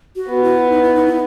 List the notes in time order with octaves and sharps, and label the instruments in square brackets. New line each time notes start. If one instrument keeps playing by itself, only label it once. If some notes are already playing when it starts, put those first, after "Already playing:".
[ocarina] F#4
[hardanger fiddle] B3
[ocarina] E4
D#4
E4
D#4
E4